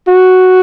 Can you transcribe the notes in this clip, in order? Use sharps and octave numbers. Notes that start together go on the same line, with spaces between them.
F#4